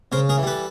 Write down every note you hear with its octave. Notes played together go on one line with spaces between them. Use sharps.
C#3 A#4 C5
G#4 A#4
E3
G3 A4 B4